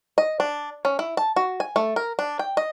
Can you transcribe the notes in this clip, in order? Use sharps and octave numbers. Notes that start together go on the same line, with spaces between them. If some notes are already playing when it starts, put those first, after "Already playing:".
D#5
D4
C#4
E4
A5
F#4
G#5
A3
A#4
D4
G5
D#5